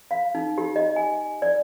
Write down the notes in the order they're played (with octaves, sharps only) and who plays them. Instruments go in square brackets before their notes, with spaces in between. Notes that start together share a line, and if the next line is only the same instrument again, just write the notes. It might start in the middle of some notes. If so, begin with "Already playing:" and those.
[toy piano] F5
D#4
G4
D#5
G#5
D5